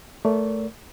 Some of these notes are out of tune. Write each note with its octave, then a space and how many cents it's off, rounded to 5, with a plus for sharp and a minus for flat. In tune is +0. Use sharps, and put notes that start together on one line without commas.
A3 +0 A#4 +0 D5 -40